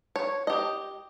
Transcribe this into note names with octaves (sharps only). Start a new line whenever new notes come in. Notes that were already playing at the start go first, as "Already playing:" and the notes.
C#5
G4 D#5